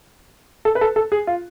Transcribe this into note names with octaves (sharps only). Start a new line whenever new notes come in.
A4
B4
A4
A4
G#4
F4